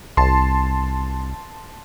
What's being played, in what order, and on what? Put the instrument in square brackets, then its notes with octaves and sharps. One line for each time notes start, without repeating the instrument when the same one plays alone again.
[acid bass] C2 [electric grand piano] A5 C6